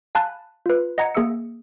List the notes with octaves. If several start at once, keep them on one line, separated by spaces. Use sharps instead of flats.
F5 G#5 A5 B5 F#6
F4 B4
D#5 F#5 A#5 G#6 C#7
A#3 G#4 E5 F#5 E6 C#7